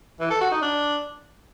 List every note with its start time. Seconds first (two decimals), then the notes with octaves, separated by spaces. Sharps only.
0.20 E3
0.30 A4
0.41 F#4
0.51 D#4
0.62 D4